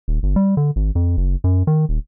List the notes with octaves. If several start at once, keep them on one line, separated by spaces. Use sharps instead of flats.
D#1
G1
G3
D3
G#1
F2
F#1
F#2
D#3
D#1